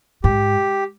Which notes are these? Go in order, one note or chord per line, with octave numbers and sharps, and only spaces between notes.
G#2 G4